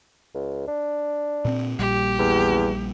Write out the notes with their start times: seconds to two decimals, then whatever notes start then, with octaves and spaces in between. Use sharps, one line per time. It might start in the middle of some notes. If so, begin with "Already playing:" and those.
0.35 C#2
0.68 D4
1.45 A#2 C4
1.79 A#1 A#2 G3 G4
2.19 E2